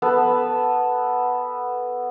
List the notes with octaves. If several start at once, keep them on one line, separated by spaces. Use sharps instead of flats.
B3 A4 B4